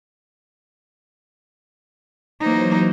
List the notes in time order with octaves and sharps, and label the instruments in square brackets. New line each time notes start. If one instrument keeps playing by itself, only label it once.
[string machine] E3 F#3 C5 [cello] A#3 D#4